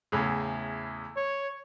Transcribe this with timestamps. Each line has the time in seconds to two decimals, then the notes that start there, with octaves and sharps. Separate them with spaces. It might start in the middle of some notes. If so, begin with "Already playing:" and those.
0.12 E2 A2 C#3
1.16 C#5